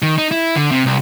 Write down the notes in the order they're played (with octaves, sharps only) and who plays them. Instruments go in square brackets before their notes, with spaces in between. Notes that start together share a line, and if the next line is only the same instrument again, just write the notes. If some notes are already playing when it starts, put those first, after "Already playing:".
[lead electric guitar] D#3
D#4
E4
D3
C3
C2